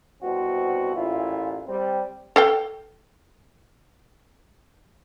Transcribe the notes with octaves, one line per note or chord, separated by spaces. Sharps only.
C2 B2 C4 F#4
A1 A#2 E4 F4
G3 C4
A4 F5 G5